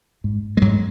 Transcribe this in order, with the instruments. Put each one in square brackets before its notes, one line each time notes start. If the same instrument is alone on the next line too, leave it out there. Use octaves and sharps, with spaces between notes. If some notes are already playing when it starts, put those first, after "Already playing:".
[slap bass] G#2
G#3
G#2 F#3